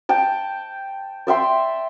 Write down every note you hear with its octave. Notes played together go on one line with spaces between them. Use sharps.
G5 A5
D5 E5 G5 C6